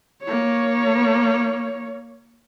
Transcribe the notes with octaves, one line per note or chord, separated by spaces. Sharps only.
A#3 C#5